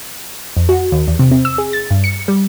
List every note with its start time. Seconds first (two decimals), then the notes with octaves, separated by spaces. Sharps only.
0.57 F2
0.69 F#4
0.92 D#2
1.07 E2
1.19 C3
1.31 C4
1.45 E6
1.58 G#4
1.73 A6
1.90 G2
2.04 C#7
2.28 G3